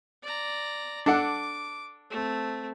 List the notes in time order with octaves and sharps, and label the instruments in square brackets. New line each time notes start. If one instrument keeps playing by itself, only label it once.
[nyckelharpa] D5 A#5
[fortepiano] D4 A4 F#5 [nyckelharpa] D6
[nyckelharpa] A3 C4